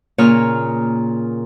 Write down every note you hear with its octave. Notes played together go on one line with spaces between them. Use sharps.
A#2 C#3 A#3 C#5 D#6 F6